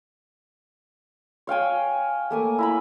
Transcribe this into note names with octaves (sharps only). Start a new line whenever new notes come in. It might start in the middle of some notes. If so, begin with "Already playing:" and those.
C#5 F5 G5 G#5
A3 A#3 G#5
E4 A#5 B5